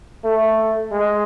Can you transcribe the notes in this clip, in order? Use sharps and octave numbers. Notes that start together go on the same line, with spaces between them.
A3
G#3